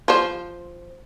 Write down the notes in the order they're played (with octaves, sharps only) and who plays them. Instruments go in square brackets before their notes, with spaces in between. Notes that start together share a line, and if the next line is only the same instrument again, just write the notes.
[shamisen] F3 C5